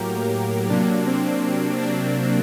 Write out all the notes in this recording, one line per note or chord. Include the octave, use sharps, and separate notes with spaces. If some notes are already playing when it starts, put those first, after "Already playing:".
Already playing: A2 F#3 A#3 G4 A#4
C3 F#3 A#3 D4
C4
D4